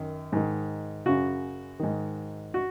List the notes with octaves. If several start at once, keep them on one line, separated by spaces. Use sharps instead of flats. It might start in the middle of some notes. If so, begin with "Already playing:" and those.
Already playing: F#2 D#3
G#2 D#3
F#2 C#3 F#4
G#2 D#3
F#4